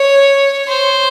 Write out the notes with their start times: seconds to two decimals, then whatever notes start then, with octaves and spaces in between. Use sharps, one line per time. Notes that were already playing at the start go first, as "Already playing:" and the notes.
Already playing: C#5
0.68 C5